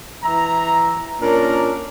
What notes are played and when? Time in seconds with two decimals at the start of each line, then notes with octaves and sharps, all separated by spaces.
0.24 E3 E5 A#5
1.21 A#2 C#4 D4 A#4